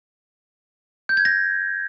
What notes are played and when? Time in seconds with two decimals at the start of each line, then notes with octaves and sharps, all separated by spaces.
1.09 G6
1.17 G#6
1.25 A#6